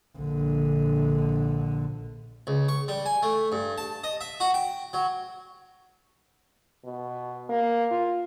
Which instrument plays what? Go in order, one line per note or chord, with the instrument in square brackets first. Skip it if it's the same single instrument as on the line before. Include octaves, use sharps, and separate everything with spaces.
[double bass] A#1 D3
[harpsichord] C#2
C#6
G3
G#5
A3
G2
A5
D#5
E5
F#4
G5
F#3
[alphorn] B2
A#3
F4